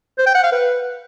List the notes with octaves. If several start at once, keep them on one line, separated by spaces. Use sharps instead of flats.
C5
G5
F#5
F5
B4